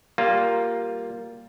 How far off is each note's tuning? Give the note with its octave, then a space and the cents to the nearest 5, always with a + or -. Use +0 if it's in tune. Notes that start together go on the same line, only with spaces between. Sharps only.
G3 +0 A#3 +0 F4 +0